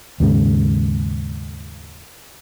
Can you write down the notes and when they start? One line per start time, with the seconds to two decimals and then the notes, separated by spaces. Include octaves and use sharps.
0.20 D#2 G#2 C#3